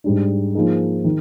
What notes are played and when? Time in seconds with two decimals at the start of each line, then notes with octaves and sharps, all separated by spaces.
0.04 G#2 G3 D4
0.55 F3 A#3 D#4 G#4
1.04 D#3